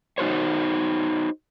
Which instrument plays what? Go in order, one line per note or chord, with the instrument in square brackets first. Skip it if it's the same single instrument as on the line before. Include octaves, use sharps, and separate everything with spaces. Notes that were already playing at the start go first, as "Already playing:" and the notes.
[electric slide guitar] D#4 F#4 C5 C#5